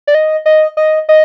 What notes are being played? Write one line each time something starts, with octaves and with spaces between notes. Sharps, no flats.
D5
D#5
D#5
D#5
D#5